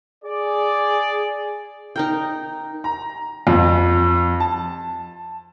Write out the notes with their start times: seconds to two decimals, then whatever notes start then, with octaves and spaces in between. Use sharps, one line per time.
0.25 G#4 D5
1.96 D#4 A#4 G5
2.84 A#5
3.47 F2
4.40 A5